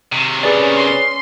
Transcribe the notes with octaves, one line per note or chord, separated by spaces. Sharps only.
C3 D#3
C#4 G#4 B4 D5
C6 C7